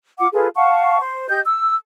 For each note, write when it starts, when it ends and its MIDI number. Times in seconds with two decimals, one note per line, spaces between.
0.19 0.28 65
0.19 0.28 78
0.19 0.28 86
0.33 0.48 65
0.33 0.48 68
0.33 0.48 69
0.33 0.48 71
0.55 0.99 77
0.55 0.99 78
0.55 0.99 81
0.55 0.99 85
1.00 1.25 72
1.28 1.39 67
1.28 1.39 75
1.28 1.39 91
1.45 1.73 88